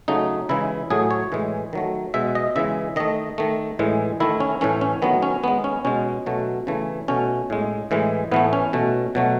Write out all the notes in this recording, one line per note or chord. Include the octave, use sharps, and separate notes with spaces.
C#3 F#3 A3 D#4
C#3 E3 G#3 E4
A2 F#3 A3 G#4
C#5
A2 E3 G#3
D#3 F#3 A3
B2 G#3 E5
D#5
C#3 E3 G#3 E5
D#3 A3 D#5
D#3 A3
A2 E3 G#3
D#3 A3 E4
C#4
A2 E3 A3 C#4
C#4
D#3 F#3 A3 B3
C#4
D#3 G#3 B3
C#4
B2 G#3 C#4
B2 F#3 A3
C#3 E3 A3
B2 A3 C#4
A2 G#3
A2 E3 G#3
A2 E3 A3 B3
C#4
B2 A3
B2 F#3 A3